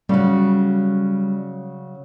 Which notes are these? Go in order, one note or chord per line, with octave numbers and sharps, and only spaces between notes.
C#3 F#3 G3